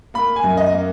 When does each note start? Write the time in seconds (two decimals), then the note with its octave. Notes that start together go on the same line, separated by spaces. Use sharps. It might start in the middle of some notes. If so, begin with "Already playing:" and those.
0.14 A#3 B5
0.36 G#5
0.44 F#2
0.57 D#5
0.72 A#3